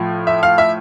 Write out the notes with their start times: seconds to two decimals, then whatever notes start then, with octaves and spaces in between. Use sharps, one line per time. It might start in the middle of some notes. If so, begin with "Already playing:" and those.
Already playing: A2 F3
0.27 E5
0.43 F5
0.58 E5